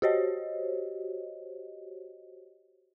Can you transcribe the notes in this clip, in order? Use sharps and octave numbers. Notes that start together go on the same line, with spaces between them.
F#4 G4 C5 C#5 D#5